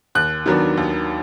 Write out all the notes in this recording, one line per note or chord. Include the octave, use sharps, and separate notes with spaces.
D#2 F#6
D#3 F#3 B3 D4
D#2